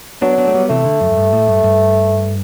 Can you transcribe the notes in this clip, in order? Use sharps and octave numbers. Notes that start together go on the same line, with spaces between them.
F#3 B3 D4
B3 D4
A3
G3 B3
C3 E3 A3
D3
F#2
F#2
G2
A2
G2
G2